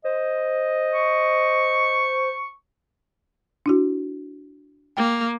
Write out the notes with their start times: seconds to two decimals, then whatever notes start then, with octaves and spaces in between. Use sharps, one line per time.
0.05 C5 D#5
0.95 C#6
3.66 D4 E4 F#4
4.97 A#3 G5